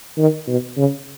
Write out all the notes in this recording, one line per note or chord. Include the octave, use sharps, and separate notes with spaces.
D#3
B2
C#3